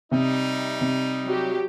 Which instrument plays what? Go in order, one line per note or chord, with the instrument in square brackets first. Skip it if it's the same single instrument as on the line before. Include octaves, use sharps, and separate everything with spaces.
[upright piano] C3 [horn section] G3 D#4
[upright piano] C3
[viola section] F#3 G4